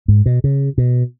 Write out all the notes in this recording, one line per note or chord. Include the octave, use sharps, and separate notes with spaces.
G#2
B2
C#3
B2